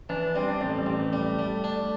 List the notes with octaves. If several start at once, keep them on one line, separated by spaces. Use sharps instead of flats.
E3 D4
D4
G3 C4
D4
A1 C4
G3
A1 C4
A3
G3
G3
D4